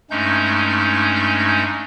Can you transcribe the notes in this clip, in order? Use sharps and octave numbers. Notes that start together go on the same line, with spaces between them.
G2 G#3 A3 C#4 D#4 G6